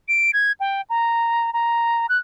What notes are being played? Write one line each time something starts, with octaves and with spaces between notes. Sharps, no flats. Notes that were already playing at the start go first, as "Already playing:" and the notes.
D7
G#6
G5
A#5
A#5
F#6